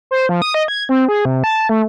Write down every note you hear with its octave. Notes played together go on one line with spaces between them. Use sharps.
C5
F3
D#6
D#5
G#6
C4
G#4
C3
A5
A3